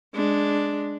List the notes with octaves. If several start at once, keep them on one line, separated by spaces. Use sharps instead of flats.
G#3 D4